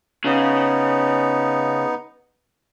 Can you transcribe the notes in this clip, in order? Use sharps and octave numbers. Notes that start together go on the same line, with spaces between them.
C#3 B3 D#4